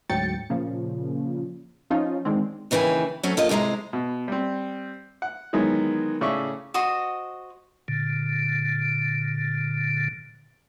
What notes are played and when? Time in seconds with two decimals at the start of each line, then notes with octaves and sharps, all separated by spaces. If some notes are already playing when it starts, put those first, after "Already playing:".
0.09 D2 G#2 F#3 G5 A6 C#7
0.50 A#2 C#3 F3
1.90 F3 C#4 D#4 F4
2.25 D3 D#3 G#3 C4
2.71 D#2 C#3 E3 G5 G#5
3.23 F#3 A3 C4 C#4
3.37 A#3 F4 D#5
3.49 F2 C3 G#3 E4 A#5
3.93 B2
4.28 G3 C4
5.22 F#5
5.53 D#3 E3 F#3 G#3 B3
6.21 A2 C#3 D5 E5 C#6
6.74 F#4 C5 D#5 C6
7.88 A#2 D3